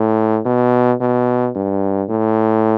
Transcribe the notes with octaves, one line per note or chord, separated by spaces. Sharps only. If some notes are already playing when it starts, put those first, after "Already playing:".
Already playing: A2
B2
B2
G2
A2